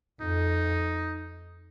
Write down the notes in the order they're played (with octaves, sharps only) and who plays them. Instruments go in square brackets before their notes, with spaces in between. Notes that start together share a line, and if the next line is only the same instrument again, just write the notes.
[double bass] F2 [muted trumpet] D#4